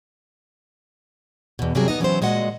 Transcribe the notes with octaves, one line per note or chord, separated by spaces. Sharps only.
E2 B2
G2 C3 F#3 G3 G#4 A#4
B3 D#4 D#5
E3 F#3 C#4 E4 G4 C5
A#2 G#3 F#4 D#5 F#5